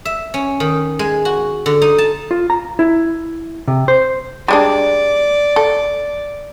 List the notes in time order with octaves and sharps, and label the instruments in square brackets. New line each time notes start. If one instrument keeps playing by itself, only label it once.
[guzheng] E5
C#4
D#3
G#3
F#4
D3
D#4
A5
[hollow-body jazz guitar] F4
A#5
E4
C3
C5
[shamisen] G3 G#3 D4 [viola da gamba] D5
[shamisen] A4